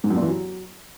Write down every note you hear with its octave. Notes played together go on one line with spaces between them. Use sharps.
G#2
F#2
A#2
E3
F#3